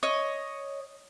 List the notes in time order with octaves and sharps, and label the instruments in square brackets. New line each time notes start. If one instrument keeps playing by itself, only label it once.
[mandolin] C#5 D#5